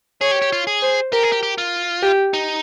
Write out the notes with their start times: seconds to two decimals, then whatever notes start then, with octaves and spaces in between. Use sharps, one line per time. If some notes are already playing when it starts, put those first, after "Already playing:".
0.21 G#4 C#5
0.31 G4
0.42 G4
0.52 F4
0.67 G#4
0.82 C5
1.12 G4 A#4
1.23 G#4
1.32 G4
1.43 G4
1.58 F4
2.03 G4
2.34 D#4